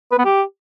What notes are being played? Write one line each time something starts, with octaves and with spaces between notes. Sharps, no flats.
B4
B3
G4